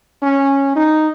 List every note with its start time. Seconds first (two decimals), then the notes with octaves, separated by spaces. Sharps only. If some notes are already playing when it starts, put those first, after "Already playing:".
0.22 C#4
0.76 D#4